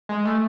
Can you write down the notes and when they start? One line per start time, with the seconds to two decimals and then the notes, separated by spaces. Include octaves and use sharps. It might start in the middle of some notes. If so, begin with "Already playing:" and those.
0.09 G#3
0.25 A3